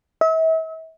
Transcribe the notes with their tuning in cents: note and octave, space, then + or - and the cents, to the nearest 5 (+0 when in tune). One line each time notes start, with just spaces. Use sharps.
E5 -40